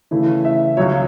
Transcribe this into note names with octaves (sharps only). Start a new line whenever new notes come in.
C#3 E3 A3 E4
E5
C#2 C#3 F#3 C#5